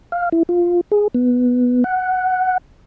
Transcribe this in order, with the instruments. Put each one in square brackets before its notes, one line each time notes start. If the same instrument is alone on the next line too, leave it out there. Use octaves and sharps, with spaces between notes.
[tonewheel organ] F5
E4
F4
G#4
B3
F#5